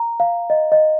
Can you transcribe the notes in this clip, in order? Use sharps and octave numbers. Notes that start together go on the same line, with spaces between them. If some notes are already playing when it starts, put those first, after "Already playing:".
Already playing: A#5
F5
D#5
D#5